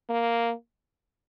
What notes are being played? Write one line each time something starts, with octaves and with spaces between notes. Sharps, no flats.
A#3